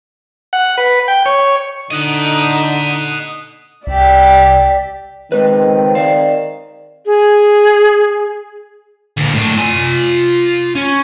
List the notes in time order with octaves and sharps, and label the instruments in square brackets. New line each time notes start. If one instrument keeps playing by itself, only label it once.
[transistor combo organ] F#5
B4
G5
C#5
[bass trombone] D3 [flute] D#4 [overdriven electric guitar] D#5 F#5 [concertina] D#6
[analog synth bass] C2 [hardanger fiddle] G4 E5 [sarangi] D5
[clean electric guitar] C#2 G#3 B4 [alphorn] D#3 [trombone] C4
[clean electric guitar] C5 D5 F5
[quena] G#4
[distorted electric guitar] D2 A#2
A2 D4
F4 G#5
C#4